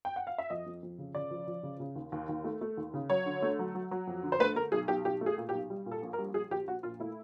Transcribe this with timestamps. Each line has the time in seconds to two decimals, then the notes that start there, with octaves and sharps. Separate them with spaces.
0.05 G5
0.16 F#5
0.27 F5
0.38 E5
0.50 F2 D#5
0.66 F2
0.83 F2
0.98 C#3
1.15 C#3 D5
1.31 F3
1.47 F3
1.63 C#3
1.80 C#3
1.96 D#2
2.12 D#2
2.29 D#2
2.44 A3
2.61 A3
2.77 D#2
2.94 C#3
3.10 F#3 C#5
3.26 D3
3.42 A3
3.59 F#3
3.75 F#3
3.91 F#3
4.07 F2
4.23 D3
4.32 C5
4.40 A3 B4
4.56 A3 A#4
4.72 B1 G#4
4.88 B1 G4
5.05 B1 G4
5.21 A3
5.26 G#4
5.38 A#2
5.49 G4
5.53 B1
5.70 G3
5.86 A#2
5.92 A4
6.03 A#1
6.13 A#4
6.18 G3
6.34 A#1 G#4
6.51 A#1 G4
6.67 A#1 F#4
6.83 A#2 F4
7.00 A3 E4